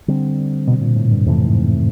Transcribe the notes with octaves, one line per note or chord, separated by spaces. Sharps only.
D3 G3 C4
B2
A#2
A2
G2
F2 G#2 C3 E3 A3
A2
G#2